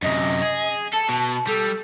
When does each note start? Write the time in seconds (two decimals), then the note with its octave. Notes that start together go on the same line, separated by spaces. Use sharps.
0.03 F#2 C3 D#5
0.42 G#4
0.93 A4 A5
1.09 B2
1.47 G3 A4